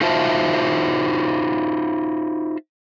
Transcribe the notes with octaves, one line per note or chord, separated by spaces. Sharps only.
D#4 F4 F#4 C5 E5 A5